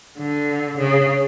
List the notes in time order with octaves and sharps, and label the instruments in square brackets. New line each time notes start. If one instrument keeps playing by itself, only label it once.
[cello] D3
C#3